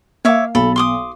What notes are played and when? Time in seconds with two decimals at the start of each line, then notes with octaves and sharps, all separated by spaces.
0.25 A#3 C#5 E5 F5 D6
0.55 B1 A4 B5
0.76 C6 D6 D#6